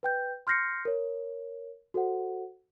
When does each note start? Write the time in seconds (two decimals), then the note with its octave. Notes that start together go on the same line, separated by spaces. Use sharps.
0.03 B4 G5 G6
0.47 C6 F6 G6 A#6 C7 C#7
0.85 A#4 C#5
1.94 F#4 A4 C5 F#5